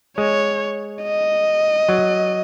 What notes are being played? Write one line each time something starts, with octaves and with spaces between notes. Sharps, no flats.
G#3 C#5
D#5
F#3